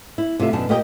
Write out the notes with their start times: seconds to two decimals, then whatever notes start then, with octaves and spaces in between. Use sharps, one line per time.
0.18 E4
0.39 C3 A3 F4 E5
0.53 F#2 B2 D4 A5
0.69 A#2 A#3 G4 A#4 D#5 G5